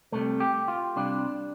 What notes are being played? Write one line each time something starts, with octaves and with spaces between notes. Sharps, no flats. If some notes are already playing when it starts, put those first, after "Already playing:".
C2 C3 G3 A3
G4
F4
C2 C3 G3 D4